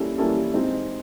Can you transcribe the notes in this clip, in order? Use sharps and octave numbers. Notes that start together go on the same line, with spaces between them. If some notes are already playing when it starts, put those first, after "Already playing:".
Already playing: G3 A#3 C#4 E4 A4
G3 A#3 C#4 E4 A4
G#3 C4 D#4